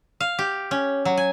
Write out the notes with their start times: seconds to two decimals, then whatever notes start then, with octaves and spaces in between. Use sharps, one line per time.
0.20 F5
0.39 G4
0.71 C#4
1.05 F#3
1.17 G#5